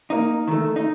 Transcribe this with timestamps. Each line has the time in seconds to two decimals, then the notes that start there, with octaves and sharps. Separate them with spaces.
0.10 A#3 D#4
0.48 D#3 A3
0.76 D#4